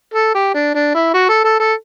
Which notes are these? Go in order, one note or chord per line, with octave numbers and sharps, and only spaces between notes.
A4
G4
D4
D4
E4
F#4
A4
A4
A4